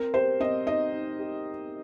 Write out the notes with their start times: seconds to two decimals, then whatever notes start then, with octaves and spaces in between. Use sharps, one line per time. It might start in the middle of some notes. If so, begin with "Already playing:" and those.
Already playing: C4 A#4
0.14 G4 C5
0.40 C4 D#5
0.66 D#4 D#5
0.92 D#4
1.19 G4